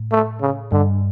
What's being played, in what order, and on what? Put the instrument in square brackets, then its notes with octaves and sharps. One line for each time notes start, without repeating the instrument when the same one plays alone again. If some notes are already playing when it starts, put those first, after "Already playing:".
Already playing: [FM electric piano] A2
[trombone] A3
C#3
[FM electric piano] G2 [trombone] D3